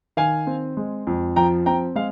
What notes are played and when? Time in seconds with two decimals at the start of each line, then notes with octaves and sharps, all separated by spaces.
0.17 D#3 F5 G#5
0.47 C4
0.77 G#3
1.07 F2
1.36 F3 G5 A#5
1.66 C4 G5 A#5
1.95 G#3 F5